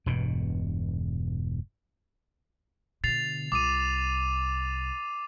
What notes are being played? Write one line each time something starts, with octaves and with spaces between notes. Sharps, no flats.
E1 G2 B2
B2 D3 A6 C7 F7
C2 D6 D#6 D#7